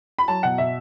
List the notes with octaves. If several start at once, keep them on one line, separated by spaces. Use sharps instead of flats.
B5
F#3 A5
B2 F#5
B2 E5